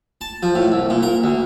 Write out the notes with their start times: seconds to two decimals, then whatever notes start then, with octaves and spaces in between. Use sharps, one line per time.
0.21 A5
0.43 F3
0.55 A2
0.72 C2
0.90 A#2
1.03 A#4
1.24 D2